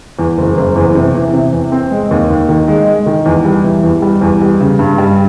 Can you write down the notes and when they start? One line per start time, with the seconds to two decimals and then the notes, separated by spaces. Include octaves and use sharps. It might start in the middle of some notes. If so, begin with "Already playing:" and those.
0.19 E2
0.38 F#1
0.57 F#1
0.76 E2
0.95 C3
1.15 E3
1.33 C3
1.53 E2
1.72 C4
1.91 G#3
2.11 D#2
2.30 D#2
2.49 D#3
2.68 G#3
2.87 G#3
3.06 D#3
3.26 E2
3.45 G3
3.64 E3
3.83 E2
4.02 G3
4.21 E2
4.41 G3
4.60 C#3
4.79 G2
4.98 G3